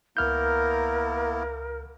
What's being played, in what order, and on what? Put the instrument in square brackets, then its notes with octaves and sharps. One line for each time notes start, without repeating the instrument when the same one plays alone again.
[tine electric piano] C#2 F6 G6 [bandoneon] A#3 B3 E4 [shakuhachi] A#4